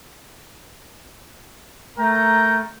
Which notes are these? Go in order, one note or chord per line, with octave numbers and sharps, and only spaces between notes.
A3 A#4 G5 A#5